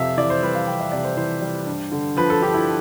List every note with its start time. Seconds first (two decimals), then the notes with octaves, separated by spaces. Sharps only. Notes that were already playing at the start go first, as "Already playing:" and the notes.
Already playing: F2 C3 E5 F5
0.17 E3 D5
0.30 C5
0.42 G3 B4
0.55 F5
0.67 F2 G5
0.80 E5
0.92 C3 D5
1.05 C5
1.17 E3 C5
1.42 G3
1.67 G2
1.92 D3
2.17 F3 B4
2.30 A4
2.42 G2 G4
2.54 E4